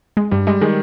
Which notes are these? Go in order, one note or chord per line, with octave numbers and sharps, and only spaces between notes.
G#3
G2 G3
G3 G#3
D#3 G#3